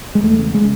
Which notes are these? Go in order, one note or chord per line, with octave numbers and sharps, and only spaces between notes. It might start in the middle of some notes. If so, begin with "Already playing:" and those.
G#3
E2 A3
C#3
C#3 G#3